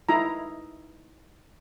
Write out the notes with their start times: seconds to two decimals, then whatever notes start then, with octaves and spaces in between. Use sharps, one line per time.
0.09 D#4 E4 A#5